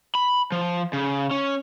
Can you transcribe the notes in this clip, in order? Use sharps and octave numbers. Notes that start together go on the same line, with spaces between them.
B5
F3
C#3
C#4